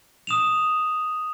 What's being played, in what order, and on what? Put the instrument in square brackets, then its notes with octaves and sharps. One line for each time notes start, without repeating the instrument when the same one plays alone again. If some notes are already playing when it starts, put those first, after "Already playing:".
[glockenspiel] D#6 E7 F7